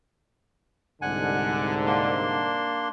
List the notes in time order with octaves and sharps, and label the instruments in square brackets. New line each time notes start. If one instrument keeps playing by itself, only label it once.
[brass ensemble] C2 G#2 D3 [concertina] F#5 G#5
[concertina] A#3 D4 C6